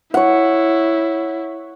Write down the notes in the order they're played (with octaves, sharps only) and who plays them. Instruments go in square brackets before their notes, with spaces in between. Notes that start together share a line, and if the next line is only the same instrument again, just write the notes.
[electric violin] E4 [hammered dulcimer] C#5 F#5